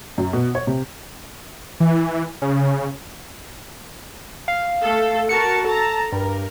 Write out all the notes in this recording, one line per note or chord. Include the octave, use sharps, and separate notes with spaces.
F#2
B2
C#5
C3
E3
C#3
F5
A3 A4
F#4 A#4 A5 C#7
A4 A5 A#5
G2 A#4